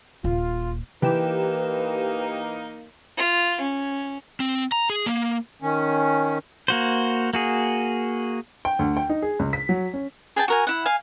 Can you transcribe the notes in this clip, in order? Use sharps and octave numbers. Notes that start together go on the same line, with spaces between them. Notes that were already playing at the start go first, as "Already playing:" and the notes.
D#1 F4
E3 A#3 D#4 G4 B4 G5 E7
F4
C#4
C4
A#5
G#4
A#3
D#3 C#4
A#3 F#4 C5
A#3 F#4 G#4
G5
D2
G5
D#4
G#4
C#2
B6
F#3
C#4
G#4 G5 A5
F#4 A#4 G#5
E4 F#5
F5 G#5